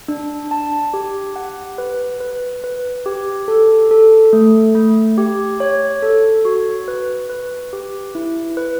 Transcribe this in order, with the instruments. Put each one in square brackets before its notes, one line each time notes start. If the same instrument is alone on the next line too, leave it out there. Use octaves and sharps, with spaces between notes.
[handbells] D4
A5
G4
F#5
B4
B4
B4
G4
A4
A4
A3
A3
G4
C#5
A4
F#4
B4
B4
G4
E4
B4